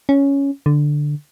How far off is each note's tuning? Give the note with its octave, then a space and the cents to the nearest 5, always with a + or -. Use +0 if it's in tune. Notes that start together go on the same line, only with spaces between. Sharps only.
C#4 +5
D3 +5